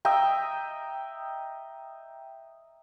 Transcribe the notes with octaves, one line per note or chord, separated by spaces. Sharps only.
D#5 E5 G5 A#5